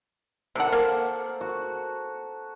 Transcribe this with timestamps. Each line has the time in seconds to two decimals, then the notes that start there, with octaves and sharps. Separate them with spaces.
0.55 C3 A4 A#4 C5 F#5
0.72 A#3
1.41 F#4